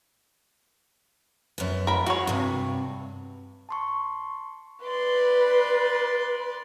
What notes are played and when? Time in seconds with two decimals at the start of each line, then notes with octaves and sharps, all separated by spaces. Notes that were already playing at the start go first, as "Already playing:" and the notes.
1.58 F#2 B3
1.87 A#4 B5
2.06 F#4 G#4 C#5
2.27 G2 C3
3.69 A5 C6 C#6
4.85 B4 D5 C6